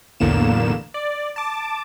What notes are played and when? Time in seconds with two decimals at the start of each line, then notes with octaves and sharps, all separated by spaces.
0.20 B1 E2 A2 D3 A#3 E7
0.94 D5
1.36 A5 D6